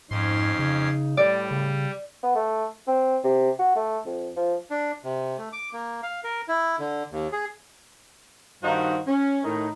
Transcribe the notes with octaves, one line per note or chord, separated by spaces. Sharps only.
F2 G#2 C#4 D#4 C6
C#3
A2 G3 D5
C#3
B3
A3
C4
C3
F#4
A3
F2
F3
D4
C3
A3
D6
A#3
F5
A#4
E4
D3
D#2
G#4
G2 D#3 D#4 F#4 C5 F5
C#4
A2 D#3 D#4